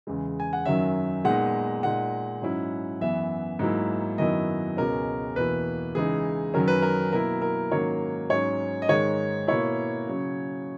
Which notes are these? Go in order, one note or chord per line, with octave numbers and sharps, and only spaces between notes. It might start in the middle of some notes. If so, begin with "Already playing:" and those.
E2 C#3 G#3
G#5
F#5
F#2 D#3 F#3 C#4 E5
A#2 G#3 B3 D#4 F#5
A#2 G#3 D#4 F#5
G#2 F#3 C#4 E4
F#2 E3 B3 E5
G#2 F#3 A#3 E4
F#2 D#3 F#3 B3 E4 D#5
C#2 B2 G#3 C#4 A#4
E2 B2 A#3 E4 B4
C#3 E3 G#3 D#4 G#4
F#2 D#3 F#3 C#4 A#4
B4
A#4
B2 F#3 A#3 E4 A#4
A#4
G#2 D#3 F#3 A#3 C#4 C#5
G#2 F#3 C#4 C#5
D#5
G#2 D#3 G#3 C#5
B2 A#3 E4 C#5
C#3 F#3 C#4